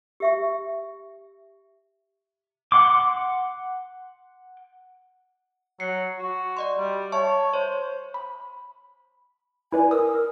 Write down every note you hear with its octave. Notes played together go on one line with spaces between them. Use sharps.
G4 E5 C#6
F#5 C6 D6
F#3 C7 C#7
F#4
D5 D#5 C6
G3
C#5 E5 A5 C#6
C5 C#5
B5
E4 B4 D5 G#5
A#4 D#6 E6